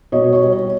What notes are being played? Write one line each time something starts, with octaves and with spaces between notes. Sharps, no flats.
B2 C#5 D#5
C#5 D#5
G3
C#5